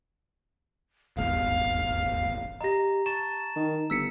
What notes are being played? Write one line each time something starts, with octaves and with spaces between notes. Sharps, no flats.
D#1 G#1 E2 F5
G4 D#5 A#5 A#6
A5 C#6 A6 E7
D#3
G1 E6 B6 C#7